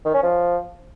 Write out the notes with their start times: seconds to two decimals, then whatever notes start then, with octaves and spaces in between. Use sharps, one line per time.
0.05 D#3
0.14 C#4
0.23 F3